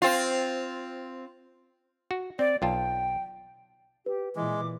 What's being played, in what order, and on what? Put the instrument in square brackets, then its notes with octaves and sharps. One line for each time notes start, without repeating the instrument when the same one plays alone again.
[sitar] C4 F4
[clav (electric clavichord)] F#4
[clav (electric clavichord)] C4 [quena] D5
[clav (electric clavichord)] B1 F4 A5 [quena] G5
[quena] G4 [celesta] B4
[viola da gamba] A#2 E3 [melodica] G#3 [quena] D6